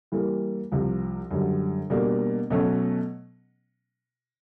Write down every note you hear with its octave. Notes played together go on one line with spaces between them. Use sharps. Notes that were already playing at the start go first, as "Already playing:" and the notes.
E3 G3 A#3
C2 C3 F3
F#2 D3 G3
B2 G3 A#3 D4
B2 F#3 A3 C#4